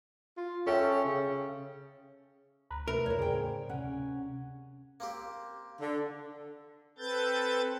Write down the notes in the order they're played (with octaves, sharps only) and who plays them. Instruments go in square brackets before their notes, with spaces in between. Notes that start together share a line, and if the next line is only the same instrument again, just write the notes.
[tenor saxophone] F4
[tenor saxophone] C#4 [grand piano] A4 E5 G5
[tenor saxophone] C#3
[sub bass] D2 [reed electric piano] A#5 B5 F#6
[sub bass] C3 [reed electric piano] A3 B4 E5 [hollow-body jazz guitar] A#4
[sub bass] E2 [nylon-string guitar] E4 C#5
[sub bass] A2 [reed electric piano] C#3 G#4 D5 [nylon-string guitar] C5 G5
[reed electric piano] D2 F#5 [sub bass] C3 [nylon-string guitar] C#4
[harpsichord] A#3 C4 G4
[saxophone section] D3
[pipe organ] C4 A4 B4 G6 A6